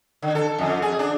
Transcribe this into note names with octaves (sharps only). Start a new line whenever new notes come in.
D3
A4
F2
G#4
D4